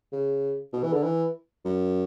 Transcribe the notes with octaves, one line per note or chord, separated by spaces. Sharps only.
C#3
B2
E3
D3
E3
F#2